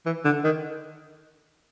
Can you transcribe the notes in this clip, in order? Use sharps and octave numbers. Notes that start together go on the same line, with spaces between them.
E3
D3
D#3